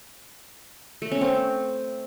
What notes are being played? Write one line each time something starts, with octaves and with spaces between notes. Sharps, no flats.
A3
C#4
C4